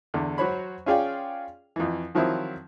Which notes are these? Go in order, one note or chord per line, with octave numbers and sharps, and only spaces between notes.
E2 D3
F#3 F#4 C5 C#5 B5
C#4 F4 G#4 D5 F5 G5
F2 E3
D#3 F3 F#3 C4 E4